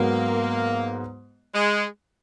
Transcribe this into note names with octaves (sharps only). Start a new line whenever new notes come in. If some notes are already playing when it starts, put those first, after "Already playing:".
Already playing: G#2 F#3 A#3 B3
G#3